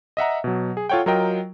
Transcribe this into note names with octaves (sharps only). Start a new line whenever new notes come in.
D#5 E5 F#5 A#5
B2 F#3
G#4
F4 A4 C#5 F#5 G5
F#3 F4 A#4 D#5 G5